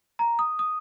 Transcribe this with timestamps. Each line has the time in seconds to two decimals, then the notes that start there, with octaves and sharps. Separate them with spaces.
0.19 A#5
0.39 D#6
0.59 D#6